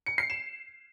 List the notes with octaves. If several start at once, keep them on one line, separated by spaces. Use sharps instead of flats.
C#7
C7
E7